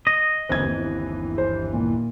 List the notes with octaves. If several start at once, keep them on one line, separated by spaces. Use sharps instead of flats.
D#5
G1 D#2 E3 C4 G#6
C5
A#2